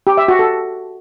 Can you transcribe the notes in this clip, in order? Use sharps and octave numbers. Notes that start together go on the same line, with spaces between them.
G4
E5
F#4
A4